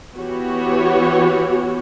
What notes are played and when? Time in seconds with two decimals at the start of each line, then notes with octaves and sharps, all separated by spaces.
0.16 E3 B3 F#4 G4 C#5